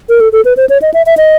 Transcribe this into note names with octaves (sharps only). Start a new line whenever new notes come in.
A#4
A4
A4
B4
C5
C#5
D#5
E5
E5
D#5